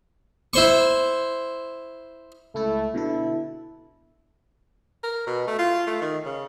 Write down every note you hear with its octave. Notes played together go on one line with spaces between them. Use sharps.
E4 C5 C#6
C#2 A3 E4 A4
B2 D3 E4 A4
A#4
B2
A3
F4
A3
D#3
C#3